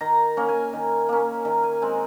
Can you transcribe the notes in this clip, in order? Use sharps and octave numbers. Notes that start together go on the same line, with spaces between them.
D#3 A#5
A#3 C#4
G#5
D#3
A#3 C#4
D#3 A#5
G#5
G#3 C4 G#5